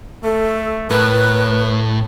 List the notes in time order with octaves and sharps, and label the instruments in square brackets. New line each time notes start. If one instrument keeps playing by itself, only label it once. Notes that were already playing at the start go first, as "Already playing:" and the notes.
[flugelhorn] A3 [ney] A4
[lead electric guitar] A2 [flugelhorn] A#4 [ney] B4